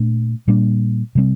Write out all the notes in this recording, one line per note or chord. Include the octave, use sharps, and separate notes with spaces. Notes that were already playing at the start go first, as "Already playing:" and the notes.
Already playing: A#2 A3 D4
A#2 G3 A#3 D4
C3 G3 C4